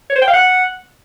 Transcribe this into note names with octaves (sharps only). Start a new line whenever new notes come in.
C#5
C5
G5
F5
F#5